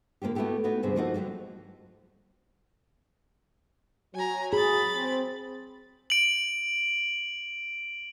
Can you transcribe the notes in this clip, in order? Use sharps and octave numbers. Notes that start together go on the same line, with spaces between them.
D3 A#3 D4 F4 G4
A3 B3 E4 F#4 G4 A4
B3 D#4 F#4 B4
D2 G2 C3 G#4
F3 A#3 D#4 F4 F#4 A4
D3 F#3 G3 A#3
F#3 G#5 A#5
G#4 B5 A6
C4
D7 F#7